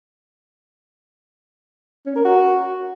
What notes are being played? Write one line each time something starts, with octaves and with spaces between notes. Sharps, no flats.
C#4
A#4
F#4